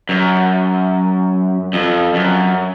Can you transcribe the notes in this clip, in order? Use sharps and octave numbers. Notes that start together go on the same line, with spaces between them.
F#2
F2
F#2